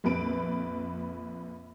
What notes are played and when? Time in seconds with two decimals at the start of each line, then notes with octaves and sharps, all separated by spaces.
0.04 A#1 F2 B4 D7